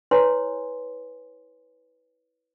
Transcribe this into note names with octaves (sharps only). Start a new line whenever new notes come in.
E4 B4 C#5 G#5 C6